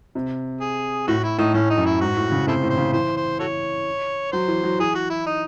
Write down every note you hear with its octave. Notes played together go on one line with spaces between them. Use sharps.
C3
G#4
A2 F#4
E4
A2 D#4
A2 C#4
D#4
F#2
E4
G#2 F#4
A2
C#3
C3 E4 A4 C5
A2
C5
C#3
E3 C5
C5
F#4 A4 C#5
F#3 C5
E3
F#3
E3 G#4
F#4
E4
D#4